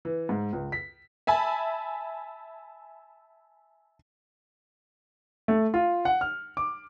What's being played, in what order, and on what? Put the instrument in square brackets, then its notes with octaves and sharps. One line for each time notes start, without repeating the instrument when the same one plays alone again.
[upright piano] E3
G#2
C#2
B6
[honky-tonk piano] E5 G#5 A5 B5
[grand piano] A3
F4
F#5
F6
D6